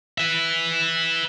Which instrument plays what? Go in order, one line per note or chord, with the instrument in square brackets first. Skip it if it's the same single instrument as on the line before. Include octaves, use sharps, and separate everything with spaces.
[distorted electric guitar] B4 E5